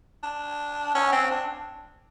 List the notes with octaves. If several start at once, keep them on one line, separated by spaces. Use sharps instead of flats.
D4
C#4
C4
D4